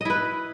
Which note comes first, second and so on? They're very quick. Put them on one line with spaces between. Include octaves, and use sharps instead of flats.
D#5 E4 B4